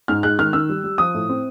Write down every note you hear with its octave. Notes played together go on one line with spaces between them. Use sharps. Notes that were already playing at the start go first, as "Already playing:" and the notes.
G#2 F6
G#3 F#6
D#3 F6
D#3 E6
G3
G3
F3 D#6
A2
C4